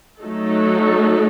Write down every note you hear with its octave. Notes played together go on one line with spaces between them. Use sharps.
F#3 A3 D#4 A4